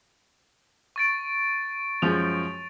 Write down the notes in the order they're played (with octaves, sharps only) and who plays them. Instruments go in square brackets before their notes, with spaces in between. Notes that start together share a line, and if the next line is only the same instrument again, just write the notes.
[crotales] C#6 A6 D7
[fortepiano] F#2 F3 G#3 [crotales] F7